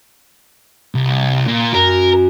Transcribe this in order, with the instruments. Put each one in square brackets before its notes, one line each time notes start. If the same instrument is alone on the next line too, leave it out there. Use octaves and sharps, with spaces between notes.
[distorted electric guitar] C2
A#2
[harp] F#2 [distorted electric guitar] A#4